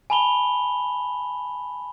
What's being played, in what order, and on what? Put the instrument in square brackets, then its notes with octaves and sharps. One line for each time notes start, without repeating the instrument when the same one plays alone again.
[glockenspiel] G#5 A5 B5 F7 G7